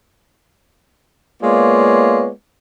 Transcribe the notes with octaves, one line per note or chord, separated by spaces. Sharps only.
G#3 A#3 B3 F4 C#5 D5